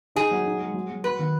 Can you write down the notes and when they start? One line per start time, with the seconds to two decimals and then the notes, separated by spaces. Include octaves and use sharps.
0.16 D#4 G#4
0.31 F#3
0.46 D#4
0.60 G#3
0.74 F#3
0.90 F#3
1.04 F#3 B4
1.19 D#3